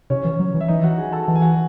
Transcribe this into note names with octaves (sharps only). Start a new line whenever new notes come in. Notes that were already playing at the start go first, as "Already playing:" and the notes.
C3 C#4 C#5
E3
F#3
E3
E5
E3 D#4 D#5
F#4 F#5
G#4 G#5
A4 A5
E3 F#5
G#5
F#4 F#5